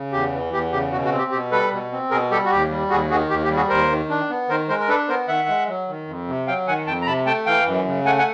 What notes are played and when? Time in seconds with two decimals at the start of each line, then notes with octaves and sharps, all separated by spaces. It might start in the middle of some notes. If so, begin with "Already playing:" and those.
Already playing: C#3
0.12 E2 G4
0.32 E3
0.53 E2 G4
0.73 C#3 G4
0.92 B2 F#4
1.05 F#4
1.12 C4
1.18 G4
1.32 B2 G4
1.52 G3 A4 B4
1.72 B2
1.92 C4
2.11 B2 G#4 A#4
2.31 G3 G4 A4
2.45 F#4
2.51 D#2 G4
2.70 G3
2.90 D#2 F#4 G#4
3.10 D#3 F#4 G#4
3.30 D#2 G4
3.44 G4
3.50 G3
3.56 F#4 G#4
3.70 D#2 A#4 C5
3.89 D#3
4.10 D4
4.30 B3
4.49 D#3 A#4 C5
4.68 G#3 A#4 C5
4.80 A#4
4.88 D4 A4 B4
5.09 B3 A#4 C5
5.28 D#3 E5 F#5
5.49 G#3
5.68 F#3
5.88 D#3
6.08 F2
6.28 C3
6.47 F#3 F5 G5
6.68 D#3 F#5 G#5
6.86 F2 G5 A5
7.02 A#5
7.07 C3 A5 B5
7.26 A3 G5 A5
7.46 E3 F5 G5
7.66 F#2
7.86 C#3
8.05 A3 F#5 G#5
8.19 F#5 G#5